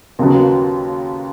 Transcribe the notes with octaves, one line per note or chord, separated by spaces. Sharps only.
D#2 C#3 F#3 B3